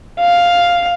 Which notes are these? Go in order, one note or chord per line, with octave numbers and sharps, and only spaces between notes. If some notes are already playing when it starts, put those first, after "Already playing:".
F5